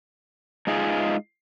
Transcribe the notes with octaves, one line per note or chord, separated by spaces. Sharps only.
G#3 D#4 F4 G#4